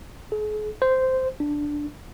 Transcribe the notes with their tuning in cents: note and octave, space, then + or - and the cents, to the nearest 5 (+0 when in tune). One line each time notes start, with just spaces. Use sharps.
G#4 +40
C5 -10
D4 +0